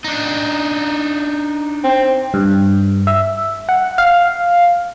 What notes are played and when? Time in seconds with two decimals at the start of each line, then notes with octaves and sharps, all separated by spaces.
0.04 D4 D#4
1.84 C4
2.34 G2
3.07 E5
3.69 F#5
3.98 F5